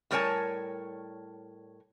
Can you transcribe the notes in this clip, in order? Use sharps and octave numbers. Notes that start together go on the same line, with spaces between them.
A2 G3 A#4 C#5 G#5 A5